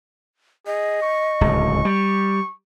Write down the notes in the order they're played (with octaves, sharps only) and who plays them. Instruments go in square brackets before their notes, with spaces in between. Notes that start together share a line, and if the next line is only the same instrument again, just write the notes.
[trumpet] G#4 [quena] D#5
[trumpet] C#6
[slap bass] D1 C#2
G3